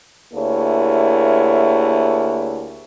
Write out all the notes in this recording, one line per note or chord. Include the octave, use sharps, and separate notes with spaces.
D2 A#3 E4 G4 G#4 C#5